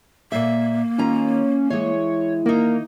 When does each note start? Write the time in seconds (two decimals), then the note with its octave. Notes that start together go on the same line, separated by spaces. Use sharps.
0.32 A#2 A#3 E5
0.98 D#3 C#4 F4 A#5
1.70 E3 G#3 C#5
2.46 D#3 A#3 D#4